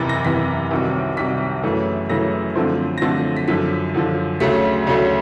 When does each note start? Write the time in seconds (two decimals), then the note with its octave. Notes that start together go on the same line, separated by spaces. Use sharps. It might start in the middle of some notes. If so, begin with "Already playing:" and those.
Already playing: F#1 E2 C3 E3 A6
0.09 A#6
0.25 F#1 E2 C3 E3 B6
0.71 C2 C3 D#3 F#3
1.17 C2 C3 D#3 F#3 B6
1.63 F#2 C#3 E3 A3
2.09 F#2 C#3 E3 A3 A#6
2.55 F#2 D3 F3 A3 C4
2.98 A#6
3.02 F#2 D3 F3 A3 C4 A6
3.37 B6
3.48 F#2 D3 F3 B6
3.94 F#2 D3 F3
4.40 D2 C#3 F#3 A3 B6
4.87 D2 C#3 F#3 A3